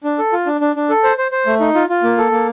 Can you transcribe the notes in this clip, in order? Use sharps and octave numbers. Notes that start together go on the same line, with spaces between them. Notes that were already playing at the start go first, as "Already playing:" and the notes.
D4
A4
F4
D4
D4
D4
A4
C5
C5
C5
A3
D#4
F4
F4
A#3
A4
A#3